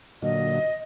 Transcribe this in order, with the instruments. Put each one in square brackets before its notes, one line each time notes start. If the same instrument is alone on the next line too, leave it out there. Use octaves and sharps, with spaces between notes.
[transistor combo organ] A#2 D3 F#3 [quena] D#5